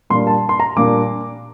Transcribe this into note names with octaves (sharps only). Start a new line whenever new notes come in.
A#2 G3 A#3 D4 C6
A5
C6
A#5
A#2 G3 A#3 D4 D6